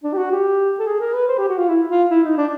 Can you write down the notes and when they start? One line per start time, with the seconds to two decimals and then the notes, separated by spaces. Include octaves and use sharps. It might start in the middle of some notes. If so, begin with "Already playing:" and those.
0.04 D4
0.13 G4
0.17 F#4
0.32 G4
0.79 A4
0.87 G#4
1.00 A#4
1.13 B4
1.28 C5
1.38 G4
1.49 F#4
1.58 F4
1.69 E4
1.90 F4
2.10 E4
2.24 D#4
2.37 D4